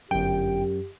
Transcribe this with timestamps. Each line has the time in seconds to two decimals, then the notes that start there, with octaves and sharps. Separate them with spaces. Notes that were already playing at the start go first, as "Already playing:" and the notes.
0.11 G1 F#2 G4 G5